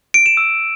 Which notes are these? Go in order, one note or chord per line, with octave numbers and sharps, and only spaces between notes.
D7
E7
E6